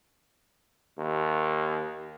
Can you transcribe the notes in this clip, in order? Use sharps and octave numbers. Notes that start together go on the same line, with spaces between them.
D#2